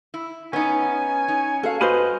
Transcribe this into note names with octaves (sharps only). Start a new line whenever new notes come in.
E4
B3 C#4 D#4 G#5
D#4
F#4 A4 F5
G2 F#4 B4 C5 D#5 G#5 B5 F6